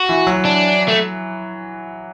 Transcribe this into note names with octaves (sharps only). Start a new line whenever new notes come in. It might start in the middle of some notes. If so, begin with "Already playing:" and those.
Already playing: F#4
E3
F#3
D4
A3